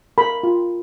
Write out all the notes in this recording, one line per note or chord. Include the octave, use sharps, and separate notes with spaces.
A#4 B5
F4